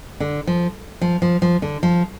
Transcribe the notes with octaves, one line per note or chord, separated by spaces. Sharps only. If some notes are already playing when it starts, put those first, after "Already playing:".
D3
F3
F3
F3
F3
D3
F3